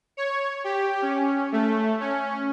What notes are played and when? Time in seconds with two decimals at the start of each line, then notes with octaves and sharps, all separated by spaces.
0.17 C#5
0.64 G4
1.02 C#4
1.52 A3
2.00 C#4